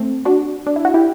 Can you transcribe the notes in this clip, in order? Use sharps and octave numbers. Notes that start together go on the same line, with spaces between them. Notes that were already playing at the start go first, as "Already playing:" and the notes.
Already playing: A3 C4
D4 F#4
D4
E4
F#4
E4 G4